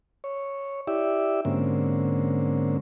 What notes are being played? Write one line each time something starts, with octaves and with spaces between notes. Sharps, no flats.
C#5
E4 G4 D5 E5
G#2 D3 A#3 C4 C#4